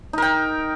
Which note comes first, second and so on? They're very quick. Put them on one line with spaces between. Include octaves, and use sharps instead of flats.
D#4 A#4 G5